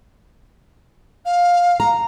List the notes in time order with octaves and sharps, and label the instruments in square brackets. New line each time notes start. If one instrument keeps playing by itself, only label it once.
[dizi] F5
[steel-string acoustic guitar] A#5